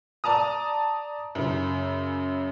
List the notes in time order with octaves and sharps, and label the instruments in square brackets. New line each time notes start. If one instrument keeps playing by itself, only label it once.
[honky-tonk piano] D5 A5 A#5 D#6
F#2 C#3